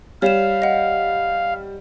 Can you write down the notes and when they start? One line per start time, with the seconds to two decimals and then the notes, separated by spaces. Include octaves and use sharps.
0.22 G3 C#5 F5 E7
0.62 D#5 F#5